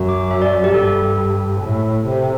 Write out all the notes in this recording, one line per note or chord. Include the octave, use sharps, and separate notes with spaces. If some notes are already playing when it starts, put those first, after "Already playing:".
Already playing: F#2
D6
E5
D5
G4
G2 A4
A2
C3